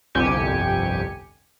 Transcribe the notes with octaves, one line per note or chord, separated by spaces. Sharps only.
G1 C2 F2 G4 G#5 C#7